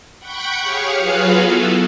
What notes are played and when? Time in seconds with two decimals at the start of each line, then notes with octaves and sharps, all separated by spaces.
0.19 F#5 G5 B5 C#6 G6
0.58 G4 G#4 C#5 F5 C#6
0.97 F#3 F4 F#4 G#4 B4 F5
1.35 B3 E4 A4